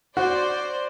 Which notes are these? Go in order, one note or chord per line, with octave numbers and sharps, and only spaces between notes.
F#4 C5 D5